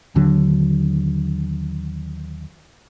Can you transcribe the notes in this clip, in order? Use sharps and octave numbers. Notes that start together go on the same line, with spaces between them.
D#2 D3 F#3 D4